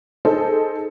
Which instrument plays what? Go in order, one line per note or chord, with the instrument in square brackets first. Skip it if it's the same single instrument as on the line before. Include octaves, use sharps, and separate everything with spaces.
[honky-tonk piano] D#4 G#4 A4 C5